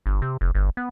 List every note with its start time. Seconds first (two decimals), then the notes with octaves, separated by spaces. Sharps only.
0.06 G1
0.22 C3
0.41 F1
0.55 G1
0.77 B3